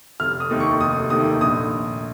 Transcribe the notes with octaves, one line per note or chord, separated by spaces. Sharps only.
F1 F6
D#6
D#2 D#3 A3
C#6
F1 D#6
D#2 D#3 A3 D#6
A#1 D#6